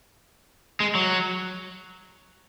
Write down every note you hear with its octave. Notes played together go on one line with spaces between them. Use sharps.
G#3
F#3